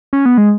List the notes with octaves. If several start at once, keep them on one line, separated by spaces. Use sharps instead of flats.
C#4
B3
G#3